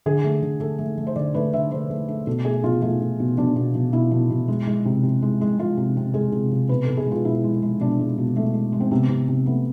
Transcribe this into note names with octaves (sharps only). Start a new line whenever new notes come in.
D3 G#4
A3
D3
A3 A4
A3
A3
C5
D3 D5
A3 B4
D3 E5
A3 C5
A3
A3
B2 A4
A3 G#4
B2 F4
A3 F4
A3
B2
B2 D4
B2
B2
B2 E4
B2
B2
G#3
G#3
C3
C3
G#3
G#3
G#3 F4
C3
C3
G#3 G#4
C3
C3
B2 B4
B2 A4
G#4
G#3 F4
B2 E4
G#3
G#3
B2 D4
G#3
B2
G#3 A3
G#3
G#3
C4
C3 B3
C3
C3
A3 B3